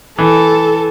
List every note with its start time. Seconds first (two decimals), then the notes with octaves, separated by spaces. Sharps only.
0.19 E3 A4